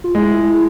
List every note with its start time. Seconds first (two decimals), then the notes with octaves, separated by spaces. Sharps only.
0.04 F4
0.15 G#3 E4